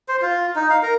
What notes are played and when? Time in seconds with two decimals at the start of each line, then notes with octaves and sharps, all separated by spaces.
0.08 C5
0.22 F4
0.56 D#4
0.70 F5
0.83 A#4